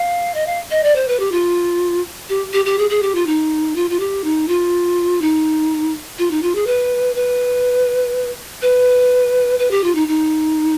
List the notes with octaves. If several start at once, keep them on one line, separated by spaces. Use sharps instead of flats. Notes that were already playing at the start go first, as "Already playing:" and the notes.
Already playing: F5
D#5
F5
D#5
D5
C5
B4
G4
F4
G4
G4
G4
G#4
G#4
G4
F4
D#4
F4
F4
G4
D#4
F4
D#4
F4
D#4
F4
G#4
B4
B4
B4
B4
G4
F4
D#4
D#4